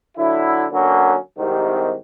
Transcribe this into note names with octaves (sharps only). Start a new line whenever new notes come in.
D3 F#3 E4
D3 F#3 A#3 B3 C#4
C2 G#2 C3 D#3